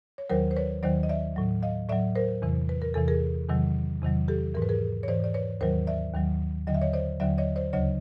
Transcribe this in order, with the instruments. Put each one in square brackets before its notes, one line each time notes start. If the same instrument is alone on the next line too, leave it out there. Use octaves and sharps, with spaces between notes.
[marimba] C#5
D#2 D#3 F#3 A#4 C5
C5
B4 C#5
D#2 D#3 F#3 C5 D5
D#5
D5 E5
A2 F#3
D#5 F5
A2 F#3 D5 E5
A#4 C5
E2 C3 E3
B4
A#4
E2 C3 E3 A4
G#4 A#4
E2 C3 D#3 F#3
E2 C3 D#3 F#3
G4 A4
G#2 E3 A#4
B4
G#4 A#4
C#5
G#2 E3 C5 D5
D5
B4 C#5
D#2 D#3 F#3 A#4 C5
D5 E5
D#2 D#3 F#3
D#2 D3 F#3 D#5
E5
C#5 D#5
C5 D5
D#2 D3 F#3 D5 E5
C#5 D#5
C5 D5
D2 C#3 F#3 C#5 D#5